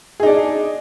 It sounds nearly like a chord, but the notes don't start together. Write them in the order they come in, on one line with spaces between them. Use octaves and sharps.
G#4 D#4 D4